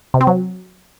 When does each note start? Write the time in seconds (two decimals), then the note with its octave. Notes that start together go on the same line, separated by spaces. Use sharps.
0.14 C3
0.21 C4
0.27 F#3